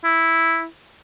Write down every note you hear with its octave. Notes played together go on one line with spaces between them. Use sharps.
E4